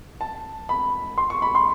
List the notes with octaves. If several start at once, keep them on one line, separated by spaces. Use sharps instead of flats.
A5
B5
C6
C#6
B5
C6